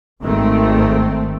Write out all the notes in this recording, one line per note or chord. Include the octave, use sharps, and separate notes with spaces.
G#1 D#3 A3 C4